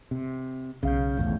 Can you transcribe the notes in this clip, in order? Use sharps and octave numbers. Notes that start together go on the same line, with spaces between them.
C3
B1 C#3 F5 G6
G#1 E2 A2